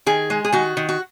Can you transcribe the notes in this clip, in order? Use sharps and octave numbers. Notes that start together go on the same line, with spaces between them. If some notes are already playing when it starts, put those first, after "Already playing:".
D#3 G#4
G#3
G#4
D#3 F#4
D#3
F#4